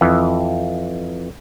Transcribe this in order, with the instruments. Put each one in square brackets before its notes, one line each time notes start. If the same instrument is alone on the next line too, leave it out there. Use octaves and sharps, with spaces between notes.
[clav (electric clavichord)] F2 E3